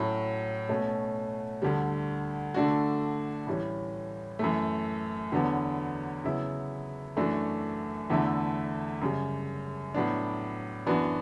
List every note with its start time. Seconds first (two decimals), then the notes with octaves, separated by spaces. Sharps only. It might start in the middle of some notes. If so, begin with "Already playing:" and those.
Already playing: A2 F#3 C#4 F#4
0.69 B2 A3 C#4 F#4
1.62 D2 D3 G3
2.54 D3 A3 D4 F#4
3.47 A2 E3 G3 C#4
4.39 F#2 E3 A3
5.32 E2 D3 F#3 B3
6.24 C#3 F#3 B3 E4
7.17 F#2 E3 A3 D4 F#4
8.10 E2 D3 A3 E4
9.01 F#2 C#3 G3
9.95 A2 F#3 B3 D4
10.86 F#2 E3 B3 D4 F#4